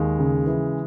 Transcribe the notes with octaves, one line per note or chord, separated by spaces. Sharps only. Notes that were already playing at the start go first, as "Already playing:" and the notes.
Already playing: D#2 G#3
C#3
E3